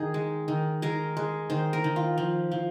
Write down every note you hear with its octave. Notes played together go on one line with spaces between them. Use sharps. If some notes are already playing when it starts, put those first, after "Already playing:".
Already playing: D#3 D#4 G#4
G#3
D#3
G#3 A#4
G#3
D#3 C5
A#4
D#3
F4
F3
F3